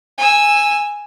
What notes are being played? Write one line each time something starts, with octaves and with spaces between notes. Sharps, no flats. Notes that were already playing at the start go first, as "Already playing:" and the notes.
G#5 E6